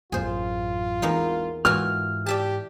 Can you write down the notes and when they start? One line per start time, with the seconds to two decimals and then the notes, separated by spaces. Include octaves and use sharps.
0.12 A1 F#2 F4 G#4 C5
1.02 G#1 E2 A#3 D#4
1.65 G#2 E3 F4 F#4 F6
2.26 G4 D5 E5 A5